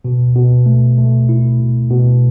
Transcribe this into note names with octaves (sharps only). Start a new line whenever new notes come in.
B2
B2
A3
A3
E4
B2
B2